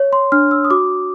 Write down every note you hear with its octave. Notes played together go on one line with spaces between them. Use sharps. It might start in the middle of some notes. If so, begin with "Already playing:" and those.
Already playing: C#5
C6
D4 F6
E6
D#6
F#4 D6